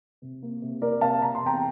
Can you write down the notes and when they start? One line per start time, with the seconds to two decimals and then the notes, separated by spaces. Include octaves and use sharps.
0.22 C3
0.43 A#3
0.62 C3
0.81 A#3 A#4 D5
1.01 C3 F5 A5
1.21 C3 A#5
1.35 C6
1.42 E2 G5 A#5